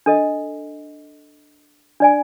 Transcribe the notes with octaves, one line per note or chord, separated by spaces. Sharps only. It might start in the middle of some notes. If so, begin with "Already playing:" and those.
D4 A4 D#5
D4 D5 G#5